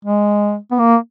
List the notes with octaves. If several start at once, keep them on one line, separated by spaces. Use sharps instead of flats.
G#3
B3
A#3